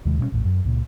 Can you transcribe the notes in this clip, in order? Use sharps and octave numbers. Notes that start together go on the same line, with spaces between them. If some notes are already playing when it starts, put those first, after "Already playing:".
D#2 C3 D#3 G#3
B2 G3 A3 C#4
A#1 E2 A2
F#2
C#2 A#2